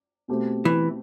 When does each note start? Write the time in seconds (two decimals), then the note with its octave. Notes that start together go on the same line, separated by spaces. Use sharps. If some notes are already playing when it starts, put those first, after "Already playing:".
0.28 B2 A3 C4 G4
0.65 E3